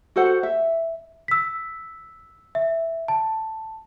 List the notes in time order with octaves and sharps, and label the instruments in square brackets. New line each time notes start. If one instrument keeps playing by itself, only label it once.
[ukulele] F#4 A4 C5 F#5
E5
[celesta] E6 B6
E5
A5